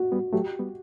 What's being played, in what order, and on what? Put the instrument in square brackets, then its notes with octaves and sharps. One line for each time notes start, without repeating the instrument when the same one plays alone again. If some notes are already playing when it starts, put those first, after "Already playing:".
Already playing: [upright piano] F#4
[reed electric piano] G3 B3
[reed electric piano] F#3 A3 [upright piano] G4
[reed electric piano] G3 B3